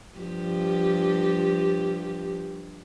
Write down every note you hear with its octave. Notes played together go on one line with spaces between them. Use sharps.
G2 F3 G4